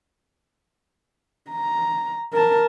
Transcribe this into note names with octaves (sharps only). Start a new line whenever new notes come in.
A#5
A#4 A5